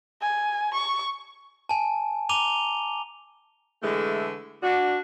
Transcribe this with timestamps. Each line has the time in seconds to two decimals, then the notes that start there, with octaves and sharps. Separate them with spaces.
0.21 G#5
0.74 C#6
1.69 G#5 A5
2.29 A#5 D6 D#7 F7 G7
3.82 D3 E3 G#3 A3
4.63 D4 F#4